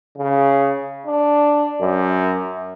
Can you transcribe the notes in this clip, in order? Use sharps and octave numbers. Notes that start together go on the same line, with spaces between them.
C#3
D4
F#2